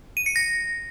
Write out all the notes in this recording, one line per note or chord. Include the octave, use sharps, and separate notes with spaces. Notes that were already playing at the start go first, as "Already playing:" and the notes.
D#7
C#7
A#6